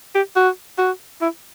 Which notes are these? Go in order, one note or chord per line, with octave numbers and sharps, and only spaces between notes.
G4
F#4
F#4
E4